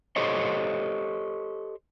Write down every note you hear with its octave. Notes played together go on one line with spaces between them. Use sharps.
G4 A4 C5 C#5 D#5